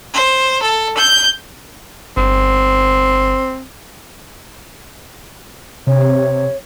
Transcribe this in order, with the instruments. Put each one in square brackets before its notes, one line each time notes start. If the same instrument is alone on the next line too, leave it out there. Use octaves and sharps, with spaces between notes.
[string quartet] C5
A4
G6
[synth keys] G1 [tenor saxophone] C4
[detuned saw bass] C3 [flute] C#5